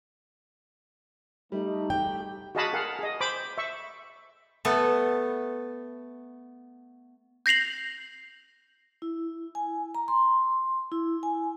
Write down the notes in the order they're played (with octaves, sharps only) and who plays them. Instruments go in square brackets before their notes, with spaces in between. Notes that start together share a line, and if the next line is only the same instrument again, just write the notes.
[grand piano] G3 [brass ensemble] A3 D#4
[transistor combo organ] G4 [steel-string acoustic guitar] G5
[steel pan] F#4 G#4 D#5 F5 A5 B5
G#4 A#4 F5 F#5
G#4 D#5
C5 B5 D6
E5 C#6
[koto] A3 B3 A4
[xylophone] G6 A#6 C7 F7 F#7
[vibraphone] E4
G#5
A#5
C6
E4
G#5